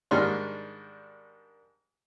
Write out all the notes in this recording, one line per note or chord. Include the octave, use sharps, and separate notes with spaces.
G#2 D#3 G3 D4 C6 F6